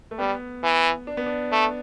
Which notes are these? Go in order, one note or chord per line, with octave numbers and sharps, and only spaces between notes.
A3
G3 B3
E3
D4
B3
D4
A3